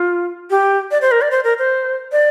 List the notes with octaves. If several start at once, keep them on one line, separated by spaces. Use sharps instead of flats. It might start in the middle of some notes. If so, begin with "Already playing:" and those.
Already playing: F4
G4
D5
C5
A#4
D5
C5
A#4
C5
D5